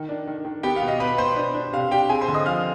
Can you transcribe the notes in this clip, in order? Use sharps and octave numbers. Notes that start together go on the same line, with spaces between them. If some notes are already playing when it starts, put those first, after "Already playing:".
Already playing: D#3
D4
D#3
D#3
B3 G4 G5
F5
B2
D#5
B3 B4 B5
B2 C5 C6
D4
D4
C3 F5
D4 G4 G5
C4 G#4 G#5
C5 C6
D3
D#5 D#6
F3 F5 F6